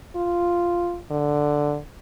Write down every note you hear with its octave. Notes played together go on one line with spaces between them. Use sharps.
F4
D3